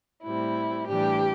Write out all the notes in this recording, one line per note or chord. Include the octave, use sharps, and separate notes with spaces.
A2 G3 C4 E4
A2 E3 G3 D4 G4